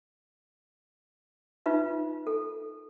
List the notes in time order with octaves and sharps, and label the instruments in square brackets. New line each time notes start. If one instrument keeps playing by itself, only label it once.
[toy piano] D#4 F4 B4 E5
A4